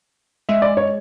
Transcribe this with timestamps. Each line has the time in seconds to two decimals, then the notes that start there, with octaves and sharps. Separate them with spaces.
0.49 G#3 E5
0.62 D5
0.77 C#5